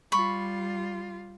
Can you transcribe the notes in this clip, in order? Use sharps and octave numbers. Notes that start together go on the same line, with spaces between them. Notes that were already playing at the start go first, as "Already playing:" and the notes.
G3 F4 B5 C#6